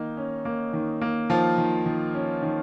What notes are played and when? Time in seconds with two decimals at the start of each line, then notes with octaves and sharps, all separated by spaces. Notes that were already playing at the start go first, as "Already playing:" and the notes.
Already playing: D#3 A#3 D#4
0.17 C#4
0.45 A#3
0.73 D#3
1.01 A#3
1.30 D#3 F3 F4
1.58 D#3
1.86 D#3
2.14 C#4
2.42 D#3